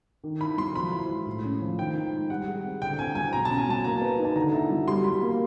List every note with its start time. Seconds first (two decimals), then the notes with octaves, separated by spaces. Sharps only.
0.24 D#3
0.40 E4 B5
0.58 F#3 C6
0.75 F3 B5
0.92 E4
1.09 G#3
1.26 A2
1.44 C#4
1.61 F3
1.78 D#3 G5
1.95 D#4
2.12 G#3
2.30 G3 F#5
2.47 G#4
2.64 C4
2.81 D3 G5
2.99 C4 G#5
3.15 F#3 G#5
3.33 B2 A#5
3.45 C#4 A5
3.58 G#5
3.68 F#3 A5
3.84 A#3 A#5
4.01 B4
4.19 D#4
4.25 A5
4.35 D3 A#5
4.53 E4
4.71 F#3
4.88 G3 C6
5.04 G3 B5
5.22 A#3